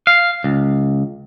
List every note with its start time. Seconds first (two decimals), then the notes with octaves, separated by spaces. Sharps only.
0.07 F5
0.44 C#2